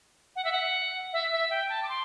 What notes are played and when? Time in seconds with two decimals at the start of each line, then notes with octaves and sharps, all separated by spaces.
0.36 F#5
0.45 E5
0.52 F#5
1.13 E5
1.32 E5
1.50 G5
1.69 A5
1.83 D6
1.89 C6